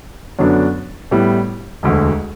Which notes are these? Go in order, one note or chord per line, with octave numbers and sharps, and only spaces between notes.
F#2 D3 F#3 B3 D4
A2 G3 B3 E4
E1 D2 D3